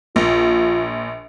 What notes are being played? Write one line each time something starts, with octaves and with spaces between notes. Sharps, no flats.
A#1 F4